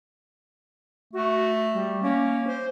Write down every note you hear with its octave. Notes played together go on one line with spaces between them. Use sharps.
A3 F#4
G3
A#3 C#4
C5